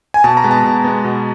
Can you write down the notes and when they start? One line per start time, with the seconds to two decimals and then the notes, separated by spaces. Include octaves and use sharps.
0.14 G#5
0.24 B2 A5
0.37 A#5
0.44 G#3 B3
0.51 A5
0.64 B2
0.84 G#3 B3
1.05 B2